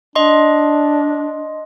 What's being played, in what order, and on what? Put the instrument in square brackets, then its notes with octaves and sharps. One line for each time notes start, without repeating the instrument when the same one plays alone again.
[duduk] D4 [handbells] D#5 C6